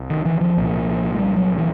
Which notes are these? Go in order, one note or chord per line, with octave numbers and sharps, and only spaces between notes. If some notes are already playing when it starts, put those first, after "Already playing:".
Already playing: C2 C3
D#3
E3
F3
C2 A#2
G#3
G3
F#3
E3